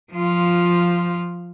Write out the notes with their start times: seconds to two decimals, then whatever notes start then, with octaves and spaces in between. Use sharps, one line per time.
0.13 F3 F4